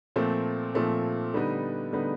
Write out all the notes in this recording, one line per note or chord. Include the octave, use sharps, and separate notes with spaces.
A#2 F3 A3 C4
A#2 F3 A3 C4
D3 G3 B3 D#4
D3 G3 B3 D#4